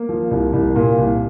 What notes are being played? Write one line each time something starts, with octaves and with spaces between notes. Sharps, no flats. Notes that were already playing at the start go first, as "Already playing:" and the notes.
Already playing: A#3
F3
C2
C2
A#2
C2